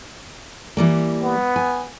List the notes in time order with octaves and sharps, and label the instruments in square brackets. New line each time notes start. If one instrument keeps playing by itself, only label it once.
[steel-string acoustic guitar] E3 G3 A#3
[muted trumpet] B3
[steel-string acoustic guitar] G#5